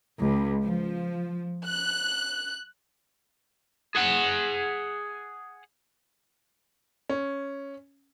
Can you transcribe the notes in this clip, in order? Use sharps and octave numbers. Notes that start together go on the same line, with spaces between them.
C#2
F3
F#6
G#4 F#5
C#4